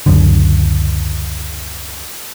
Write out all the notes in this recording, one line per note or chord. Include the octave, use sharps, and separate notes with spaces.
C#2 F#2 D3